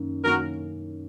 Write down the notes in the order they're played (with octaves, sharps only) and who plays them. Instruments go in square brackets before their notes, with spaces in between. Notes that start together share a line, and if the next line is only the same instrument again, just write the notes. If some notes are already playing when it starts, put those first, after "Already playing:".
Already playing: [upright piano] F#2 D#3 A#3 C#4
[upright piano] F#2 D#3 A#3 C#4 [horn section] F#4 A#4